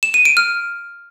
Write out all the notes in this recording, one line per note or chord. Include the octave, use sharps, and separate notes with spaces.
E7
D#7
D7
F6